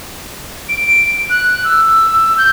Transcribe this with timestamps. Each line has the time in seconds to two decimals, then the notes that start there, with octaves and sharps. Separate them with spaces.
0.69 D7
1.30 F#6
1.64 E6
2.38 G6